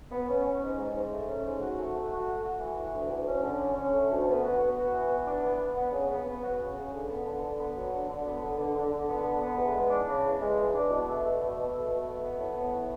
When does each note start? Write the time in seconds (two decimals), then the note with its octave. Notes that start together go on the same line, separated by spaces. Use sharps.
0.11 B3
0.27 C#4
0.45 C#4
0.61 G#2
0.78 G#2
0.94 G#2
1.11 A3
1.27 C#4
1.44 G#2
1.61 F#4
1.77 A3
1.94 A3
2.10 F#4
2.27 A3
2.44 F#4
2.60 E3
2.77 E3
2.93 D2
3.10 D2
3.26 C#4
3.42 D3
3.60 C#4
3.76 C#4
3.92 A3
4.09 D2
4.27 B3
4.43 F#4
4.59 B3
4.76 F#4
4.92 E3
5.09 B3
5.26 D4
5.43 B3
5.59 B3
5.75 B3
5.92 C#3
6.09 B3
6.25 B3
6.42 F#4
6.58 C#3
6.75 C#3
6.91 D3
7.08 B3
7.25 D3
7.41 D3
7.59 B3
7.75 F#3
7.91 D3
8.07 D3
8.24 B3
8.40 D3
8.58 D3
8.74 D3
8.91 D3
9.07 B3
9.24 D3
9.40 B3
9.57 E2
9.74 G#3
9.90 D4
10.07 C#3
10.24 E2
10.41 G#3
10.56 E2
10.74 D4
10.90 B2
11.06 A3
11.23 A3
11.40 B2
11.56 B2
11.73 A3
11.89 B2
12.07 A3
12.22 B3
12.39 A2
12.56 B3
12.72 A2